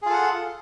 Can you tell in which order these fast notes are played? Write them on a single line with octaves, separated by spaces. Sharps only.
G#4 F4 A4 F#5